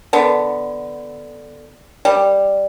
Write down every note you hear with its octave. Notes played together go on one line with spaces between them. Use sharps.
D3 B3
G3